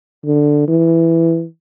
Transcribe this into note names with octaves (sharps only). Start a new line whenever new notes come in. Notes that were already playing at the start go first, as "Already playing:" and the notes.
D3
E3